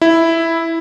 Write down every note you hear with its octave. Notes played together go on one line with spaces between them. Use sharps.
E4